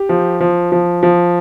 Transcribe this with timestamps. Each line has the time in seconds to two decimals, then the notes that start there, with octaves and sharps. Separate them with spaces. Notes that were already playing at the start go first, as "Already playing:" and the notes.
Already playing: G4
0.09 F3
0.40 F3
0.72 F3
1.03 F3